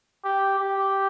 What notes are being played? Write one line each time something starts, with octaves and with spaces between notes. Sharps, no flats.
G4
G4